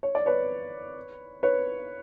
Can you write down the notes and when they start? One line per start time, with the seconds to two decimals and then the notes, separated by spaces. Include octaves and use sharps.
0.03 C#5
0.15 D5
0.26 B4 C#5
1.43 B4 C#5